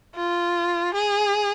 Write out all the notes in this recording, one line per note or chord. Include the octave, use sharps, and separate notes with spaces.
F4
G#4